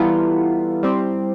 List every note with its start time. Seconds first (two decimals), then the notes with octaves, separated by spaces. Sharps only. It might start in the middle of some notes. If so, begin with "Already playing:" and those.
Already playing: E3 G3 B3 E4 F4 A4
0.83 G3 C4 G4